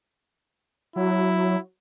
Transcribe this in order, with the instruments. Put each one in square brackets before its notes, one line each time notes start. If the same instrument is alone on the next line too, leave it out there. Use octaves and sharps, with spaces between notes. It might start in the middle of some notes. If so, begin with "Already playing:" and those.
[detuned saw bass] F#3 [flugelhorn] E4